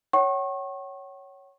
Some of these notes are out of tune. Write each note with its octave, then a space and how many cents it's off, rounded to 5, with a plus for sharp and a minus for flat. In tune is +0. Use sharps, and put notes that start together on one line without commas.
C#5 +0 F#5 +45 C#6 -35